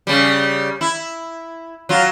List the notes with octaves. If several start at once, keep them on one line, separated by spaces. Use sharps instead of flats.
C#3 G3
E4
F#3 F4